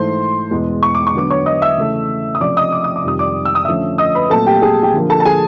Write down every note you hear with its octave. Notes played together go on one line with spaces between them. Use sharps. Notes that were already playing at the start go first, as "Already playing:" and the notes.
Already playing: G#2 E3 A3 C5 C6
E2 B2 G#3
C#6
D6
C#6
D3 F#3 B3 D6
C#5 C#6
D#5 D#6
E5 E6
C#3 E3 A3
D#6
C3 F3 A3 C#4 D5 D6
D#5 D#6
D6
D#6
D6
F2 C3 D#3 G3 D#6
D5 D6
E6
D#6
D3 F3 A3 C#4 E5 E6
D#5 D#6
B4 B5
A#2 F#3 A3 C4 A4 A5
G4 G5
G#4 G#5
G4 G5
D3 F3 A#3
A4 A5
A5
G#4 G#5